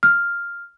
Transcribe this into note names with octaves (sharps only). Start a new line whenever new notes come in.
F6